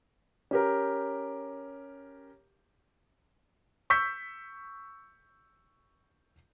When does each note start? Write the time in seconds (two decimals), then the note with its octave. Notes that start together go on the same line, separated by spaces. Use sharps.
0.51 C#4 G4 A#4
3.90 C#6 E6 G6 B6